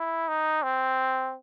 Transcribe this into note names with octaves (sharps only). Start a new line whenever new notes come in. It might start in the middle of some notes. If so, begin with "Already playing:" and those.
Already playing: E4
D#4
C4